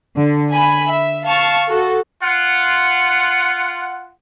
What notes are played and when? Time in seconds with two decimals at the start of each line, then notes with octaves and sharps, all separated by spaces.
0.16 D3
0.50 G#5 B5
0.89 E5
1.25 F5 A5 C#6
1.67 F#4 A4
2.22 F4 F#5